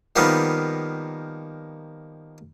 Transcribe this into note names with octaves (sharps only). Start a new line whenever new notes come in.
D#3 F3 G3 A#3 B3 D#4